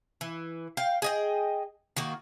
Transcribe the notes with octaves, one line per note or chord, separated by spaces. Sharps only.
E3
F5 G5
G#4 D#5 G5
D#3 A#3 F#4